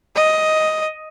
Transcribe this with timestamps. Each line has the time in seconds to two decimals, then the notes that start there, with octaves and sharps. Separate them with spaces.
0.16 D#5